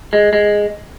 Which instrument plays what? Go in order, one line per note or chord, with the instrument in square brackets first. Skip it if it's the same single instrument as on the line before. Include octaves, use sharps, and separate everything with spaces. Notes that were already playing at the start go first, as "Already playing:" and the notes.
[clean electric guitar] G#3
G#3